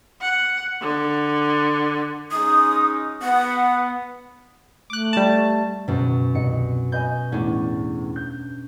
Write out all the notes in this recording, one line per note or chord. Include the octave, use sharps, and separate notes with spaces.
F#5
D3
G#3 C#4 D#4 D#6
B3 F#5
A3 D6 F#6
G3 A5
C#2 F#2 B2
C2 D#5 C#7
B4 D#5 G#5 G6
E2 A2 C#4 D4
G6